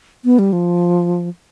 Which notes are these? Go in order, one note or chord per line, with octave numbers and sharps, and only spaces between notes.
B3
G3
F3